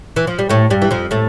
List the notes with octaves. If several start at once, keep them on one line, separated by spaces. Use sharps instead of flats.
E3
F3
G3
A2 A3
G2 G3
E3
F2 F3
A2 A3